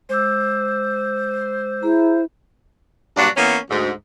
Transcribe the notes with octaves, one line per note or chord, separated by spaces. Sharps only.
G#3 C5 D6 E6
E4 G#4 A#5
G2 A#2 F#3 D4 F#4 D5
E3 A#3 B3 C#4
D2 G#2